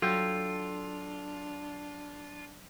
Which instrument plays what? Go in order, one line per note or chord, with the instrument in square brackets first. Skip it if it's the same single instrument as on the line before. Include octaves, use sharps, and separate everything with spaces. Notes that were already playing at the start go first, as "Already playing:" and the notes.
[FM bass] F#3 [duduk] D4 [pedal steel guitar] F4 [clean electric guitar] A4 G5